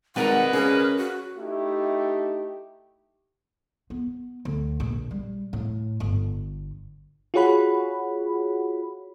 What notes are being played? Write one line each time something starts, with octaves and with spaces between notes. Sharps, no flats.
G#1 G3 G#3 A#4 B4 F#5
C#3 G#4 A#4
F#4
A3 D#4 E4 G4
B3
D2
A#1
G3
A2
G1
F4 F#4 G#4 C#5 F#5 B5